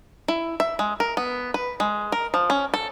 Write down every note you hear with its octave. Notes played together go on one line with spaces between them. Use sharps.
E4
E5
G#3
A#4
B3
B4
G#3
A#4
F3
C#4
A4